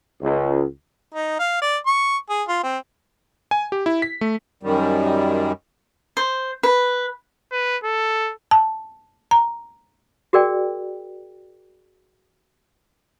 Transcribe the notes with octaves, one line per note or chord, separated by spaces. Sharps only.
C#2
D#4
F5
D5
C#6
G#4
F4
C4
G#5
G4
E4
B6
A3
F#2 D#3 G3
C5
B4
B4
A4
A5
A#5
F#4 G#4 A#4 D5 G5